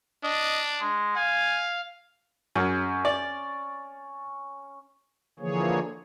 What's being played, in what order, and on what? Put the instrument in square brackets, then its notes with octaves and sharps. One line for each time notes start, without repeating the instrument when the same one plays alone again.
[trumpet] D4 [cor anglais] D#5
[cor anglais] G#3
[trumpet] F5 [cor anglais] G#5
[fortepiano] F#2 [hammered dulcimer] C#4
[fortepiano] D5
[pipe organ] D3 E3 F3 A#3 G#4 C#5